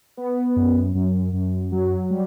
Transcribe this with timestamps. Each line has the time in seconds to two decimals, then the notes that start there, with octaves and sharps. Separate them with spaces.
0.17 B3
0.56 F#2
0.95 F#2
1.33 F#2
1.72 F#3
2.10 G3